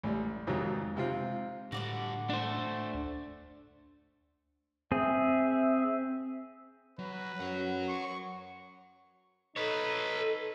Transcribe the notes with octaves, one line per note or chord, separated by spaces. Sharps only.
A1 G3
F2 G#2 C3 D#3 F#3
G#2 C3 C4 F4
A2 D3 G3 F#4 D5 F#5
A3 D4 C5
D2
C4 G#4 E5
F#3 B4
F#2 C#5 F#5
C#6
D#4 A4 B4 C#5